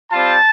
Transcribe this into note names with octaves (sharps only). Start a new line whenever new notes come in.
G3 C4 F4 A5